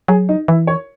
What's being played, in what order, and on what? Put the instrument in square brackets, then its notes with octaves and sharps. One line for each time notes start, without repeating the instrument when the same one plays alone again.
[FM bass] F#3 [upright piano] G#4
[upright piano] D#4
[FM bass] E3 [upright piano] E4
[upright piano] C#5